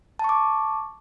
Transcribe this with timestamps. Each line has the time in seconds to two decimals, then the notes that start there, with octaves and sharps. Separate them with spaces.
0.19 A5
0.24 C#6
0.29 D6